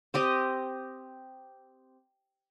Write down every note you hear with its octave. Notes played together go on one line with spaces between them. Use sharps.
C4 G4 D#5